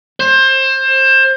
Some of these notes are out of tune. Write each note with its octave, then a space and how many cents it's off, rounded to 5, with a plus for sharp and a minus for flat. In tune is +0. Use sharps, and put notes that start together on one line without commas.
C5 +25